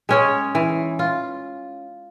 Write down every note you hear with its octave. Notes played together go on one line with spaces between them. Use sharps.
G#3 C#4 C#5
E3
F4